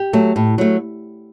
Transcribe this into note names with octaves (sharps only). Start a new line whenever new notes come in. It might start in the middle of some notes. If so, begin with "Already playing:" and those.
Already playing: G4
F#3 A3
A2
F#3 A3